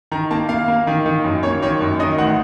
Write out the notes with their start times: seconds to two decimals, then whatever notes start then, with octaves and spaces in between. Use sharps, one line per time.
0.11 D#3 A#5
0.31 A#3 A5
0.49 A#3 F5
0.68 A#3
0.87 D#3
1.06 D#3
1.24 F#2
1.43 A#3 C#5
1.62 D#3 C#5
1.81 F#2
1.99 D#3 D#5
2.18 A1 F#5